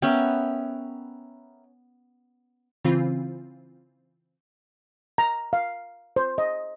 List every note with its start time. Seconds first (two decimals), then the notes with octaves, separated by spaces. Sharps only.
0.02 B3 C#4 A#4 E5 G5
2.84 C#3 E3 C4 F4
5.18 A#5
5.53 F5
6.16 C5
6.38 D#5